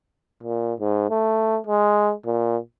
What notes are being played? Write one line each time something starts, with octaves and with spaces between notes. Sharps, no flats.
A#2
G#2
A3
G#3
A#2